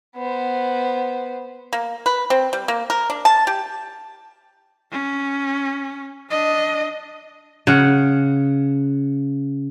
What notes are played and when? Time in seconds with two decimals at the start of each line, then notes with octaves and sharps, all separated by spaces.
0.16 B3 C5
1.73 A#3
2.06 B4
2.30 C4
2.53 G3
2.68 A#3
2.90 A#4
3.10 D4
3.25 A5
3.47 G4
4.92 C#4
6.31 D4 D#5
7.67 C#3 F#5